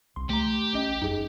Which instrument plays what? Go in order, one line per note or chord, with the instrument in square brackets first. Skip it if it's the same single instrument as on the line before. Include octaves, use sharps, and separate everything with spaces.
[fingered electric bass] C2 [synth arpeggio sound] C6
[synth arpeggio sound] C#2 A#5 [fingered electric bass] A3 [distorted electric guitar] G4
[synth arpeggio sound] A1 C#4 D#5
[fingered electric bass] F#1 F#2 [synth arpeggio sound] D#4 G#4